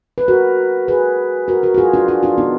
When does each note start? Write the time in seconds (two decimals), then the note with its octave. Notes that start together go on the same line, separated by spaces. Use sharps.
0.18 B4
0.28 F#4 A#4
0.88 G#4 B4
1.48 F#4 A#4
1.63 F#4 A#4
1.74 F#4
1.78 F4 G#4
1.94 D4 F4
2.08 D4 F4
2.23 D4 F4
2.38 B3 D#4